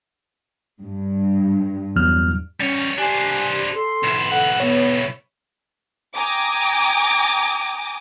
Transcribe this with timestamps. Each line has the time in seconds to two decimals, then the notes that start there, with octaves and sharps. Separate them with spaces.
0.81 G2
1.96 E2 F#3 F6
2.60 G3 C#4 C#5
2.98 D4 G4 C5 G#5
3.74 A4 C6
4.04 B1 E4
4.32 A4 F#5
4.60 B3 C#5
6.15 G5 G#5 A#5 D6 D#6